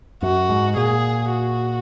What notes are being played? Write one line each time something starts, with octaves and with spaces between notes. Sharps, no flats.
F#2 F#4
G#2
A#2 G#4
F#4